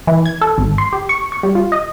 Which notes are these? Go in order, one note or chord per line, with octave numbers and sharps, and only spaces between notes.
E3
G#6
A4
G#1
C6
G4
C#6
C#6
G3
F4
D#5